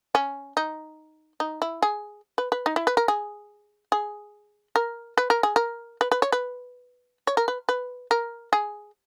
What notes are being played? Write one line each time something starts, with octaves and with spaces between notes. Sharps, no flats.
C#4
D#4
D#4
E4
G#4
B4
B4
D#4
E4
B4
A#4
G#4
G#4
A#4
B4
A#4
G#4
A#4
B4
B4
C#5
B4
C#5
A#4
B4
B4
A#4
G#4